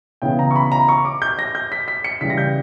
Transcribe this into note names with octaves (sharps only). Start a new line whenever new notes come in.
C#3 E3 B3 G5
A#5
C#6
B5
A#5
C#6
D6
G6
A#6
G6
B6
B6
C#7
C#3 E3 G3 B6
A#6
G6